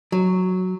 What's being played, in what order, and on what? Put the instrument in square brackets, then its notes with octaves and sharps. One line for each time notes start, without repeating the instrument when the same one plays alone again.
[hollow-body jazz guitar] F#3